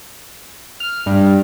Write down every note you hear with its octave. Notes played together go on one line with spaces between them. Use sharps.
F6
G2